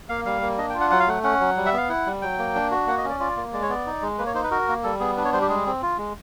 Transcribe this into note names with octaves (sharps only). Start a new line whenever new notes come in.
A#3 F5
G3 F5
A#3
D4 D#5
G5
F4
F#5
F#3 F#5
F5
A3 F#5
C#4 F#5
F#3
G3
E5
B3 F5
E4 F#5
G3
F#3 G5
A#3
D4
F#4
A#3 F#5
D#5
C#4
D5
F4 D5
A#3
G#3 D5
C#5
B3 D5
D#4
G#3
A#3 B4
C#5
D#4 C5
B4
F#4 A#4
A#3
G3 A4
B3 G#4
D4 B4
C#5
G3 C5
G4
G#3 G#4
C4
F4
G#3